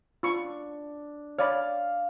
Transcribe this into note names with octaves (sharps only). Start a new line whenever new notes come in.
D4 F4 B5 C#6
C#5 D5 F5 B5